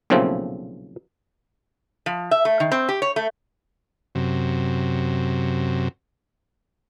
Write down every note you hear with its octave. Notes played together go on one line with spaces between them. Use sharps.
B1 A#2 C#3 F3 A3 C4
F3
E5
A3
D#3
C4
G4
C#5
A3
F#2 C3